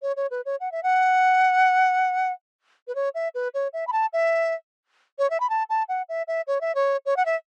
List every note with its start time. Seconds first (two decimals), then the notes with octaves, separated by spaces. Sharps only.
0.02 C#5
0.16 C#5
0.31 B4
0.45 C#5
0.60 F#5
0.72 E5
0.83 F#5
2.88 B4
2.95 C#5
3.15 E5
3.35 B4
3.54 C#5
3.73 E5
3.87 B5
3.92 A5
4.13 E5
5.18 C#5
5.30 E5
5.40 B5
5.50 A5
5.70 A5
5.89 F#5
6.09 E5
6.28 E5
6.47 C#5
6.61 E5
6.75 C#5
7.06 C#5
7.17 F#5
7.26 E5